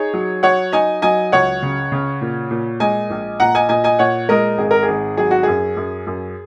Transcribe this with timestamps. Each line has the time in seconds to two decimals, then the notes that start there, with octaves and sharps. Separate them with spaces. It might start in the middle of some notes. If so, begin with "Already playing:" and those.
Already playing: D#4 G#4 C#5
0.13 F#3
0.43 F#3 C#5 F#5
0.72 D#4 D#5 G#5
1.02 F#3 D#5 G#5
1.32 C#2 C#5 F#5
1.63 C#3
1.92 C#3
2.21 A#2
2.51 A#2
2.80 G#3 D#5 G#5
3.10 A#1
3.40 A#2 F#5 A#5
3.55 D#5 G#5
3.69 A#2 D#5 G#5
3.84 D#5 G#5
3.99 A#2 C#5 F#5
4.29 G#3 A#4 D#5
4.58 G#1 G#4
4.71 A#4
4.83 G#4
4.88 G#1
5.17 F#3 G#4
5.31 F#4
5.43 F#2 G#4
5.77 F#2
6.07 F#2